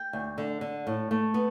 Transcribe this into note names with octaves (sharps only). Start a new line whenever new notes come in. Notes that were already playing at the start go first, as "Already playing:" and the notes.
Already playing: G5
D2
D3
D3
A2
A3
B3